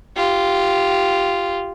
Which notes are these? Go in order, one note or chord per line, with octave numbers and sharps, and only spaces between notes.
F4 G4